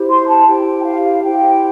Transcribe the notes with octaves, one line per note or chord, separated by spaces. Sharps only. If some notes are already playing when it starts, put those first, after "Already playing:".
Already playing: E4 G4 C5
C6
A5
E4 G4 C5 G5
F5
E4 G4 C5 G5